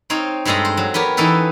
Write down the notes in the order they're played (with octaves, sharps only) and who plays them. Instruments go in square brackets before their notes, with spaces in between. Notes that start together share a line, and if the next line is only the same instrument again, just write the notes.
[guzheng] C4 D#4 C#5 F5
G2 G3 G#3 A4 D#5 A#5
C5
F#3
B3 G4 A#4 C#5
E3 C#4 D#4 A4 B4